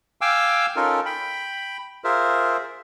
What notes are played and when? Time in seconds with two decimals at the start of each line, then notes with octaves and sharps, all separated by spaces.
0.21 F5 G5 G#5 D6 E6
0.76 C#4 D#4 F4 A4 A#4
1.06 G5 B5
2.04 F4 G#4 A#4 C5 E5